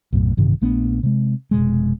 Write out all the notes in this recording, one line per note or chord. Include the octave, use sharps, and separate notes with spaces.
B1 F#2 A2
A1 G2 C3 D#3
A#1 A3 B3 D4
C3 G#3
F1 B2 G#3